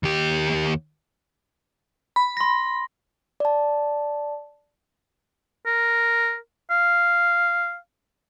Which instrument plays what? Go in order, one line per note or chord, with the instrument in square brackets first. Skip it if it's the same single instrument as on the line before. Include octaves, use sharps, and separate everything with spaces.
[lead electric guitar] D#2 G4
[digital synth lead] B5
[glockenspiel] C6 A#6
[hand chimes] D5 A5
[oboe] A#4
F5